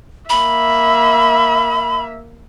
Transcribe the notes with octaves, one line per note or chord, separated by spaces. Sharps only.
A#3 E5 B5